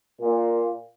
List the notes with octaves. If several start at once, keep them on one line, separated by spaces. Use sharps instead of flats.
A#2